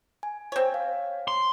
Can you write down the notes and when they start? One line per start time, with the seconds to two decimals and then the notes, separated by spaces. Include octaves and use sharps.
0.23 G#5
0.52 C4 C#5
0.74 F5
1.28 C6